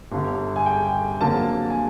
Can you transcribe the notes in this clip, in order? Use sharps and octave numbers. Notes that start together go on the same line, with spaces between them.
G1 G2 D3
G#5
G5
F2 D3 F#3 A#3 A5
G#5